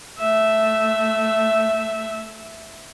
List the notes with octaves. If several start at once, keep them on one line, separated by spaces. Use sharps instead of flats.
A3 E5